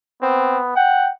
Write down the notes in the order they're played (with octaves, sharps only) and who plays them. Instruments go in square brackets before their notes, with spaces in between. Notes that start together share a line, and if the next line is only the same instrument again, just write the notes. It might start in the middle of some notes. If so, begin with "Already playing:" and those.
[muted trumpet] B3 [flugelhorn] C4
[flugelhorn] F#5 [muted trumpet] G5